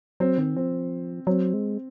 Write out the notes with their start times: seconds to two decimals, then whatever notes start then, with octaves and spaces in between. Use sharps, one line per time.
0.20 F#3 C4
0.38 D#3 C4
0.56 F3 C4
1.27 F#3 C4
1.54 G#3